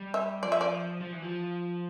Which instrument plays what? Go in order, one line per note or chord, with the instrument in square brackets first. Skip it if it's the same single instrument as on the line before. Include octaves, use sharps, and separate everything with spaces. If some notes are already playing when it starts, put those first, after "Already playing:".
Already playing: [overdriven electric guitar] G3
[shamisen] E5
[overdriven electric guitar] F3 [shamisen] D5
[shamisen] E5
D5
[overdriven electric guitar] F3
E3
F3